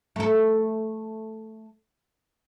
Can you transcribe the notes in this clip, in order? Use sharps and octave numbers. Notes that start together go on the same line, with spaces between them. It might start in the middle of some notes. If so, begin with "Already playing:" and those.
A3 A4